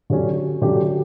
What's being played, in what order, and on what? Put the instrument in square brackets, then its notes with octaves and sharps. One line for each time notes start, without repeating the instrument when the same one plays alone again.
[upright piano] D3 F#3 C#4 G4
D3 F#3 C#4 G4